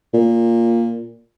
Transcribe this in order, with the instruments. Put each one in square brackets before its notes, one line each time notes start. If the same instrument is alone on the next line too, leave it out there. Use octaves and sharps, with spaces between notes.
[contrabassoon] A#2